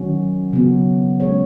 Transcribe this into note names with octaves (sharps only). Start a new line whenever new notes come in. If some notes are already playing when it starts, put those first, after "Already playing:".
Already playing: D#3 F#3 C#4 F#4
C#3 F#3 B3 F#4
G#3 C#4 G#4 C#5